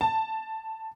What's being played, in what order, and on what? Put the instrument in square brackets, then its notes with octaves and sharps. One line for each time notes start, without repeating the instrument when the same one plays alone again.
[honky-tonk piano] A5